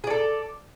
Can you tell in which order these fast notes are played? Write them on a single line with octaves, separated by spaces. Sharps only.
G#4 D5 A4